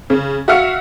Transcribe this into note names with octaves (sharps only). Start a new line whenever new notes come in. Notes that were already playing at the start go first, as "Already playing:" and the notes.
C#3
F#4 E5 F5 F6 C#7